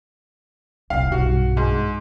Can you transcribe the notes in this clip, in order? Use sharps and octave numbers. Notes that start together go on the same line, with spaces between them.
D#1 C2 F5
B1 G2 F#4
G#2